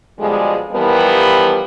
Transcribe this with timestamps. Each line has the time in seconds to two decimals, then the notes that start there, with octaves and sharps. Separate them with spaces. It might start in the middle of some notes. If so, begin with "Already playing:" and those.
0.20 B2 D3 F3 G3 G#3
0.73 E3 F3 G3 B3 G4 A#4